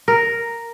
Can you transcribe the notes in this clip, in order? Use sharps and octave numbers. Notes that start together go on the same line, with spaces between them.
A#4